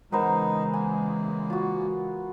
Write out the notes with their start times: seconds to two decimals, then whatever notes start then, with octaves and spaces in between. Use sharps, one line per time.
0.12 C#3 E3 G#3 B3 D#4 A#4 C5
0.74 A#3 G#5
1.50 F4 F#4